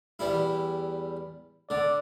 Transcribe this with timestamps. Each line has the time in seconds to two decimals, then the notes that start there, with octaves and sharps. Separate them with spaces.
0.19 E2 G3 E4
1.70 D3 D5